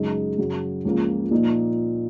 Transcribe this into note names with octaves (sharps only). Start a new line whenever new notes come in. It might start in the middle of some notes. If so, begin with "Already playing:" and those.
Already playing: F#2 C#3 G#3 D#4
F#2 C#3 F#3
C#2 C#3 F3 A#3 C#4
A#2 F3 A#3 D#4